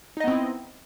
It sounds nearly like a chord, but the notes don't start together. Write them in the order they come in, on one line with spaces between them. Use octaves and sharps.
D#4 D#5 B3 C4 E4